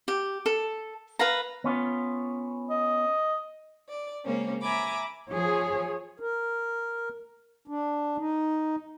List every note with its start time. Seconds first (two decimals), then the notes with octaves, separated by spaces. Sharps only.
0.08 G4
0.46 A4
1.19 B4 F5 A#5
1.64 B3 C#4 F4
2.70 D#5
3.88 D5
4.24 C#3 G#3 A#3 C4 C#4
4.61 E5 G#5 A#5 B5 D6
5.30 F3 G#4 C#5
6.20 A#4
7.68 D4
8.17 D#4